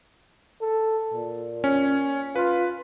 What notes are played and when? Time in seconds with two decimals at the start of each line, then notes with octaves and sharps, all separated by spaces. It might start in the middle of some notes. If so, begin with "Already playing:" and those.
0.61 A4
1.14 A#2
1.64 C#4
2.36 F4 B4